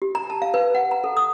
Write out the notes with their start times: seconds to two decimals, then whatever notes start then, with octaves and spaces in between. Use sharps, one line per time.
0.02 G4
0.15 A#5
0.30 A5
0.42 F5
0.54 B4
0.75 F#5
0.91 A#5
1.04 A4
1.17 D#6